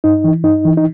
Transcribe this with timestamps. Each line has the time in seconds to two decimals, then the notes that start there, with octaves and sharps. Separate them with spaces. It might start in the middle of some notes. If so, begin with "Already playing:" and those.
0.04 G2 D#4
0.24 E3
0.44 G2 D#4
0.65 E3
0.77 D#4